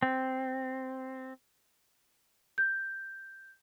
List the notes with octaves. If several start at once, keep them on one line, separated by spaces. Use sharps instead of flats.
C4
G6